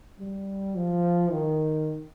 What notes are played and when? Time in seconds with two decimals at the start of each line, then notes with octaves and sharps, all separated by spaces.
0.19 G3
0.75 F3
1.31 D#3